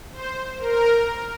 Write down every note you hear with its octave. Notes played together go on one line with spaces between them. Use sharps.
C5
A#4